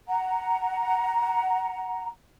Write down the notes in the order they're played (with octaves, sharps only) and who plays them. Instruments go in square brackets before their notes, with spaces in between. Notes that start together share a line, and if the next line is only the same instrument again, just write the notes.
[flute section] F#5 A#5